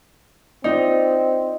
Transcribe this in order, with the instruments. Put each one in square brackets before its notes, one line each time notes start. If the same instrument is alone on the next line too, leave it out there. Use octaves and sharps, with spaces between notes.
[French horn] C4 [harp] D#4 [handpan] F4 D5 D#5